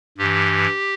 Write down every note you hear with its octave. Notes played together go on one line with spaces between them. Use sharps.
G2 E3 G4